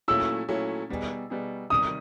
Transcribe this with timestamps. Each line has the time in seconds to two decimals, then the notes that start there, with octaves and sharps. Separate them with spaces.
0.08 A#2 F#3 A3 C#4 E4 E6
0.49 A#2 F#3 A3 C#4 E4
0.90 B2 G3 B3 D#4 G#4
1.30 B2 G3 B3 D#4 G#4
1.70 C3 D#3 G3 D#6